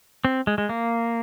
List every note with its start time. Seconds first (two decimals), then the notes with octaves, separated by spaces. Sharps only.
0.25 C4
0.47 G#3
0.58 G#3
0.69 A#3